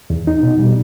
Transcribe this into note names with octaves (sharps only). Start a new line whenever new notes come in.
E2
D#4
B2
G3